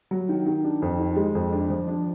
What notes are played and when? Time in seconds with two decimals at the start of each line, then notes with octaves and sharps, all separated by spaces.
0.11 F#3
0.29 D#3
0.46 D#3
0.64 D4
0.82 F2
1.00 D#3
1.16 G#3
1.35 F2
1.52 D4
1.70 F3
1.88 D4